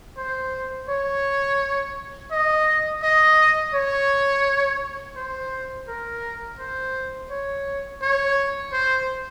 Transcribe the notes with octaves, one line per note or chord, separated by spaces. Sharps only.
C5
C#5
D#5
D#5
C#5
C5
A#4
C5
C#5
C#5
C5